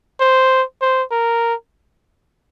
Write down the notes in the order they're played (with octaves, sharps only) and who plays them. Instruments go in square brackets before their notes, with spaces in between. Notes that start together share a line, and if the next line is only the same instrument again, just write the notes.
[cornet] C5
C5
A#4